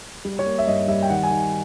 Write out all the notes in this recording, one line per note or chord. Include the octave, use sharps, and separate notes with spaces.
G3
C#5
A#3
E5
G2 D#5
G3 E5
G5
D#3 F#5
G#5
D#3